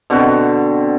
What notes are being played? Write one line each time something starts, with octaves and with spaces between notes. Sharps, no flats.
B2 D3 C4 F#4